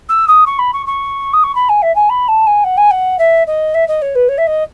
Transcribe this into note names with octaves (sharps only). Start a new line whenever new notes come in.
E6
D#6
C#6
B5
C#6
C#6
D#6
C#6
B5
G#5
E5
G#5
B5
A5
G#5
F#5
G#5
F#5
E5
D#5
E5
D#5
C#5
B4
C#5
E5
D#5